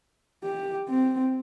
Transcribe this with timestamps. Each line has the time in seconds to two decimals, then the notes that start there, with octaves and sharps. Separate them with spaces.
0.43 G4
0.88 C4